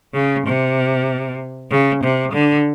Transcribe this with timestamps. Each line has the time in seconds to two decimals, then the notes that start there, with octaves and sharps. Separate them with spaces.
0.14 C#3
0.46 C3
1.70 C#3
2.03 C3
2.33 D3